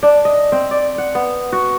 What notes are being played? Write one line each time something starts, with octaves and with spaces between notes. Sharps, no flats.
D4
D#5
C4
D5
F#5
B3
F#4